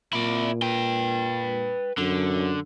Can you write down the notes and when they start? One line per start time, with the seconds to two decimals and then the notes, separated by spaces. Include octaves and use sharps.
0.13 A#2 E4 D5
0.62 B4 G5
1.98 F#2 D3